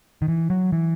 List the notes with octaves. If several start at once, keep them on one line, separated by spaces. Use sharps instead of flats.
D#3
E3
F#3
E3